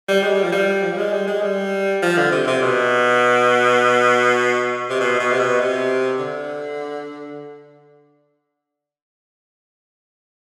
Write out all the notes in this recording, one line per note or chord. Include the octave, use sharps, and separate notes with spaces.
G3
G#3
G3
F3
G3
F3
G3
G#3
G3
G#3
G3
F3
D3
C3
C3
B2
C3
B2
B2
C3
B2
C3
D3